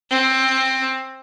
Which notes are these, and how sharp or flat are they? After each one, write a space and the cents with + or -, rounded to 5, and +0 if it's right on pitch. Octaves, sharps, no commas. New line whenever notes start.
C4 +15